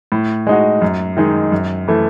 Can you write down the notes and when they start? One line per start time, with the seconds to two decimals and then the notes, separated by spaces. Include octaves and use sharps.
0.12 A2
0.47 G#3 D#4 F#4
0.82 F#2
1.17 D#3 G#3 D#4
1.52 F#2
1.88 E3 A3